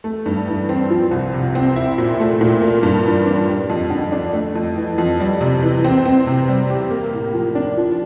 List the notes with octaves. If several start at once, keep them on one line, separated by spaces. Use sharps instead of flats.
A3
G2
E3
C4
F3
C2
C3
C4
E4
A#2
A3
A#2
A#3
G2
E3
D4
G3
F2
D3
D4
A3
F2
E3
F2
G3
C3
E3
C4
C4
C3
G3
G4
A#3
A2
F3
D4
F3